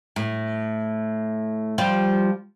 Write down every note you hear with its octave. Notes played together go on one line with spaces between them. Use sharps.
A2
F3 G3 F4